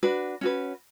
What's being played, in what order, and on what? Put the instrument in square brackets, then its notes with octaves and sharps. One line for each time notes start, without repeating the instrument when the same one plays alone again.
[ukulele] D4 F#4 B4
C#4 F#4 B4